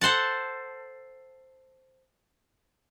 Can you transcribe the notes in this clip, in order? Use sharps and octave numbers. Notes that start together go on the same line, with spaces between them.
A4 C5 F#5 A5